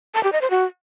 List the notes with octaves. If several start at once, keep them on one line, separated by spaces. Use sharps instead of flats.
A5
G4
D#5
C5
F#4